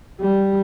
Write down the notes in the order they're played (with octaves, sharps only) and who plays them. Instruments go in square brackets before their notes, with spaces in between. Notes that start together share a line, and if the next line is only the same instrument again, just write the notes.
[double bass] G3